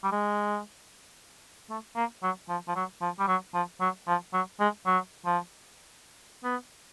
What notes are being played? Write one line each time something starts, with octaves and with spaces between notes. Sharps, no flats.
G3
G#3
A3
A#3
F#3
F3
F3
F#3
F3
G3
F#3
F3
F#3
F3
F#3
G#3
F#3
F3
B3